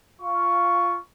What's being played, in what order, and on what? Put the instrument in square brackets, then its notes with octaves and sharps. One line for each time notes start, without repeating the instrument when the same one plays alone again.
[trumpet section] F4 C#6